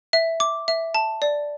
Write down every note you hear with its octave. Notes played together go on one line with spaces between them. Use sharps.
E5
D6
E5
A5
D5